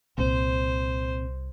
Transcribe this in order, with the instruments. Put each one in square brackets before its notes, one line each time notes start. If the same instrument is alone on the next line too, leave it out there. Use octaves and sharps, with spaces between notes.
[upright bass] C2 [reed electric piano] A#2 C4 [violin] C5